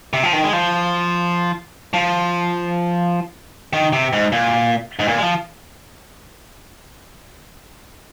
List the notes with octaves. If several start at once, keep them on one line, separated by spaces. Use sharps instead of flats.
C3
F3
D#3
G#3
F3
F3
D#3
C3
G#2
A#2
G#2
A#2
G#3
F3